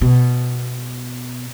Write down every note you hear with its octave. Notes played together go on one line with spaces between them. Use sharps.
B2